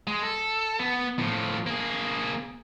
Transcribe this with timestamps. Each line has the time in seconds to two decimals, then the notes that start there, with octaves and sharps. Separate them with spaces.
0.07 G#3
0.23 A4
0.79 B3
1.19 A2 F3
1.67 A#3 G#4